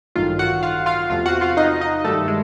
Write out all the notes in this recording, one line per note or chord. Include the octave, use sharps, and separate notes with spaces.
A1 G2 D#3 F#3 A3 F4 F5
F#4 F#5
F4 F5
F4 F5
E2 C3 F3 A3 F4 F5
F#4 F#5
F4 F5
D#4 D#5
D#4 D#5
G2 D#3 G3 A3 A4
G#3